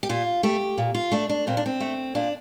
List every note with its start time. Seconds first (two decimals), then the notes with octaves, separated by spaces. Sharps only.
0.03 G4
0.09 A#2 F4
0.43 A3 G4
0.78 A#2
0.95 F4
1.12 A3 D4
1.29 D4
1.47 A#2 C4
1.57 D4
1.66 C4
1.80 A3
2.15 A#2 D4